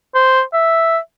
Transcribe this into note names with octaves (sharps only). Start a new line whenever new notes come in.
C5
E5